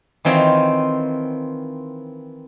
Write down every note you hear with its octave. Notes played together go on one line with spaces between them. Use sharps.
D#3 E3 C4 F4 C#5 D#5